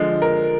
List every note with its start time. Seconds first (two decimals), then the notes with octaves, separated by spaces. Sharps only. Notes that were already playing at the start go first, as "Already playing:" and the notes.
Already playing: D3 F3 G#3
0.22 A#4